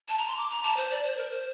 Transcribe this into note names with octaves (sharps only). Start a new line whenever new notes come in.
A5
A#5
C6
D6
A#5
A5
C5
D5
C5
A#4
C5